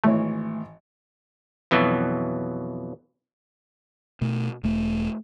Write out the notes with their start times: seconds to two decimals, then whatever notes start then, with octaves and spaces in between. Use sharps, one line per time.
0.04 G#1 E3 A3 C#5
1.71 F2 B2 E3 F#3
4.21 B2 A3
4.63 E1 A3